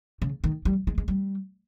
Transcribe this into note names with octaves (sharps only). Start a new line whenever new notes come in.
C#3
D#3
G3
G#3
G#3
G3